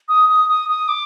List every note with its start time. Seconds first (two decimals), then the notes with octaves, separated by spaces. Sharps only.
0.09 D#6
0.29 D#6
0.49 D#6
0.69 D#6
0.88 D6